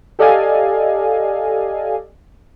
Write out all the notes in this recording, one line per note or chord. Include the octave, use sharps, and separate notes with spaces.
G4 A4 D5 D#5 F5 G#5